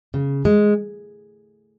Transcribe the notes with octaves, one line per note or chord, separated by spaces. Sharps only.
C#3
G#3